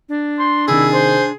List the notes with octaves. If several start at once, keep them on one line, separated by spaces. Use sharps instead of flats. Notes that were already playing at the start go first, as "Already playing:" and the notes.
D4
C6
C3 D#3 E4 G#4
C5